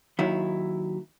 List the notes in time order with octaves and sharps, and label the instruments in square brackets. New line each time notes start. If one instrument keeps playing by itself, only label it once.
[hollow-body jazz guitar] D#2 D#3 F#3 E4